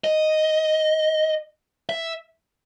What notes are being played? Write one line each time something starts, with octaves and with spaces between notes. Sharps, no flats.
D#5
E5